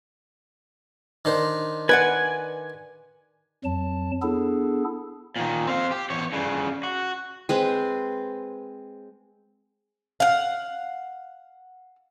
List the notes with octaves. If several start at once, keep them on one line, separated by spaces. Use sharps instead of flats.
D#3 D4 C5
B4 D5 F#5 G#5
F2 F#3 A5
B3 D4 E4 G#4 A4
A#2 D#3
C4 F5
G4
E2 C#5
G2 C#3
F#4
G#3 C4 B4
F5 F#5